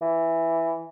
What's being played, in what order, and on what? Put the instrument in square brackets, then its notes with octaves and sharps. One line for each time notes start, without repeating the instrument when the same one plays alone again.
[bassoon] E3